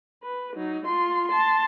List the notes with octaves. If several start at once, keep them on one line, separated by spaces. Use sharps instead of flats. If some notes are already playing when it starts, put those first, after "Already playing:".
B4
F#3 D#4
F4 C6
A5 C6